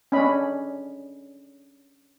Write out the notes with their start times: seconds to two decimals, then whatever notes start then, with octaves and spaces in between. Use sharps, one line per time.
0.12 C#4 D4 D#5 B5